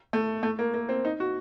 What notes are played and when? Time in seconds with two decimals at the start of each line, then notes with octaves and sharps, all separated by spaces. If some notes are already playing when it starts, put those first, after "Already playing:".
0.13 A3
0.43 A3
0.59 A#3
0.74 A#3
0.89 C4
1.05 D#4
1.20 F#4